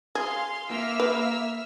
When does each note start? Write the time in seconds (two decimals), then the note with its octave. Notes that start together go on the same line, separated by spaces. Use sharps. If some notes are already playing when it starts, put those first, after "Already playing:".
0.15 G#4 F5 C6
0.71 A#3 E5 E6 F6
1.00 B4